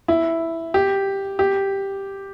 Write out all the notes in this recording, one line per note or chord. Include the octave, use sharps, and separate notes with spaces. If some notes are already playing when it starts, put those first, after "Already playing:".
E4
G4
G4